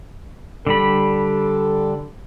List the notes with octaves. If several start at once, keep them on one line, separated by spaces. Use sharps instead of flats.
D3 G3 A4 B5